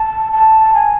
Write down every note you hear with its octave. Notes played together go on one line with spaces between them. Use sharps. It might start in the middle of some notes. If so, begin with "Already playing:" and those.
Already playing: A5
A5
G#5